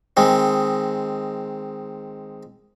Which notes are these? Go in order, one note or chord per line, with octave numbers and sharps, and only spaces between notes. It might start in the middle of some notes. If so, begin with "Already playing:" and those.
D#3 G#3 C4